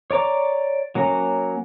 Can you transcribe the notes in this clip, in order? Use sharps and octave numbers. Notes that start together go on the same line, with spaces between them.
C#5 D5 A#5 D6
F#3 A#3 C#4 A#5